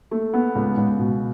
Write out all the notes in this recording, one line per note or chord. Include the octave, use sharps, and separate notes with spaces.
A3
B3
C#2
C#2
B2